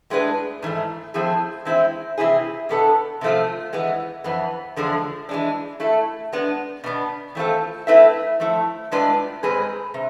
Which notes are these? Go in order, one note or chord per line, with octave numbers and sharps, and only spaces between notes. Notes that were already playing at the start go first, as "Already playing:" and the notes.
A2 G#3 D4 G#4 B4
G#2 E3 A3
F3 A3 C4 E4 G#4
E3 G#3 C4 E4
C3 E3 A3 E4 G#4
B2 B3 D4 A4
C3 F3 A3 C4 F4
E3 G#3 B3
F2 E3 B3
E2 D3 F3 G#3
E3 G#3 D4
A3 E4 A4
G#3 B3 D4
B2 B3 D4
E3 A3 C4 F4 A4
A3 C4 E4 B4 E5
F3 A3 E4
A2 G#3 D4 F4 B4
G#2 G#3 C4 G#4 B4
C3